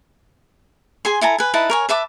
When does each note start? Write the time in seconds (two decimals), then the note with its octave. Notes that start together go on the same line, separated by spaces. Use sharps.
1.05 G#4 G#5 C6
1.21 E4 A4 G#5 A#5
1.38 B4 G#5
1.54 D#4 E4 B4 A5
1.70 A#4 C#5 G#5
1.89 B4 E5 A5 D6